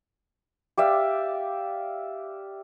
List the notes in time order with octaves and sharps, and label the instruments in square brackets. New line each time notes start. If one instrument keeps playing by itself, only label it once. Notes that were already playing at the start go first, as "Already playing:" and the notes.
[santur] G4 D5 E5 F5